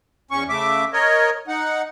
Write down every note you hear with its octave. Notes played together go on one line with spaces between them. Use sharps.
E2 C#4 C#6
C#3 A3 E5 D6
A#4 C#5 D#5
D#4 F#5